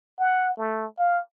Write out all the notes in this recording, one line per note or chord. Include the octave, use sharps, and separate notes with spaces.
F#5
A3
F5